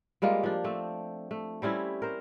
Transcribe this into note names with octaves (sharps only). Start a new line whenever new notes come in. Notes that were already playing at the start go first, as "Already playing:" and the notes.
G3 G#3 A#3 F4
F3 D4
A3 C4
A3
G3 C4 C#4 E4
A#4 C5